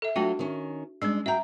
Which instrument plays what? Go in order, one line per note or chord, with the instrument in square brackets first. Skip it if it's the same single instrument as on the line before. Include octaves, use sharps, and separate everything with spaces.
[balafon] A4 E5
[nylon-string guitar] F#3 A3 F4 [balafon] D4 F#4 G5
[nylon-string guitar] D#3 C#4
[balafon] G3 C#4 [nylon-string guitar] G#3 D4
[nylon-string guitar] F#4 G5 [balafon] E5 A#5